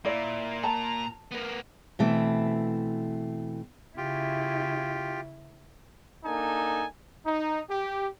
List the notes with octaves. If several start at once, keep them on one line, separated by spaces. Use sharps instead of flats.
A#2 A#3 E4 D5
A5 A#5
B3 A#4
B2 E3 A3 C4
C#3 E4 F4 G4
A#3 D4 D#4 A4 G#5
D#4
G4